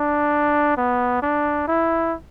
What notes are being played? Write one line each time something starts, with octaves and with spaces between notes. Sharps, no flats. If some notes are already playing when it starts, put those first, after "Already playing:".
Already playing: D4
B3
D4
E4